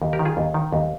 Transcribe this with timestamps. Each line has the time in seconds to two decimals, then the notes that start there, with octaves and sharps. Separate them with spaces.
0.02 D#2
0.13 G4 A#4
0.19 D#3
0.25 F4 G#4
0.37 D#2
0.54 D#3
0.72 D#2